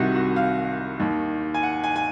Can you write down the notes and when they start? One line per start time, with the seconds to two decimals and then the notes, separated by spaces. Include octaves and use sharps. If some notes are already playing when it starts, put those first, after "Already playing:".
Already playing: C2 C3 D#3 F#4
0.15 F#4
0.36 F5
1.00 D#2 D#3
1.54 G#5
1.63 F#5
1.84 G#5
1.96 G#5